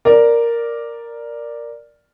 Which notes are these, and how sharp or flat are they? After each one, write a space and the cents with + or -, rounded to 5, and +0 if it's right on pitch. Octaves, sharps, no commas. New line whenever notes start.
A#4 +0 D5 +0